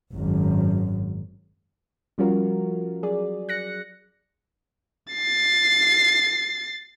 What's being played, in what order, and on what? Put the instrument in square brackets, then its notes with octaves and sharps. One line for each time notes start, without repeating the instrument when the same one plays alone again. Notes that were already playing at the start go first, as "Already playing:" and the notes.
[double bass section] G#1 F#2
[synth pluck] F3 G3 C#4 F4 F#4 A#4
F#3 G#4 D5
F#6 A#6 C#7
[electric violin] A6 C7